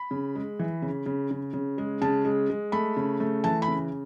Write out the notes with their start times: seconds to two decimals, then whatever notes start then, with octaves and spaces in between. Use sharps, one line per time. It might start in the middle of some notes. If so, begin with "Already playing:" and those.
Already playing: B5
0.11 C#3
0.35 G#3
0.59 E3
0.82 C#3
1.06 C#3
1.31 C#3
1.54 C#3
1.78 G#3
2.02 C#3 A5
2.25 G#3
2.50 G#3
2.72 A3 B5
2.97 C#3
3.20 A3
3.44 E3 A5
3.62 B5
3.68 C#3